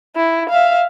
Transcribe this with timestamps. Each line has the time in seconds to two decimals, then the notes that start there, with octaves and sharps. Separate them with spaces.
0.16 E4
0.50 E5 F5